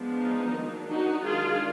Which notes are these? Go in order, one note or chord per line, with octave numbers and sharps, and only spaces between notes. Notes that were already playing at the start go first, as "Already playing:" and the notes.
Already playing: F3 G#3 B3 D4
D#4
D#3 F#3 A#3 D4
D#4 F#4
D#3 G#3 D4 F4 G#4